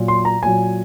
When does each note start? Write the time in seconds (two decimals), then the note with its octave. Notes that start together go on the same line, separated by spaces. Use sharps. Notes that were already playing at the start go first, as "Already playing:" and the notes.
Already playing: A#2 F#3
0.08 C6
0.25 A#5
0.43 A#2 F#3 G#5